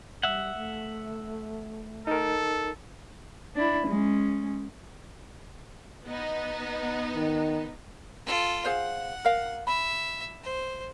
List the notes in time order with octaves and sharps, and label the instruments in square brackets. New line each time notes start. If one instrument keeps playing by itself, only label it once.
[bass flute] G3 [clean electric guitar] E5 F#5
[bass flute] A3
[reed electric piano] D#4 A#4 [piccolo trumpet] A4
[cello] D4 E4
G#3 C#4
[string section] B3 D#4
[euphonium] D#3
[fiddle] F4 A4
[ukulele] G#4 C5 F5 [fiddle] F#5
[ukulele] A#4 F5
[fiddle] E5 [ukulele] B5
[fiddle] C5